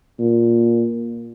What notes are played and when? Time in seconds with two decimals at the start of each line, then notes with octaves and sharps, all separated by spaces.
0.19 A#2